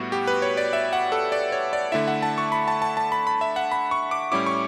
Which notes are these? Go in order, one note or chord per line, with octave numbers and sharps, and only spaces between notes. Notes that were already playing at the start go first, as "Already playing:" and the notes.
Already playing: A2 G3 B3 E4 F#4
G4
B4
C#5
D5
E5
F#5
A4
D5
C#5
D5
D3 A3 E4 E5
F#5
A5
C#6
B5
A5
A5
A5
B5
B5
E5
F#5
B5
C#6
D6
A2 G3 C#4 E4 D6
C#6